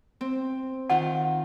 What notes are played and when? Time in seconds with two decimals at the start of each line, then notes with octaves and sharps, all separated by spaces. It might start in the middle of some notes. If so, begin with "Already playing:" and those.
0.21 C4
0.90 D#3 F4 F#5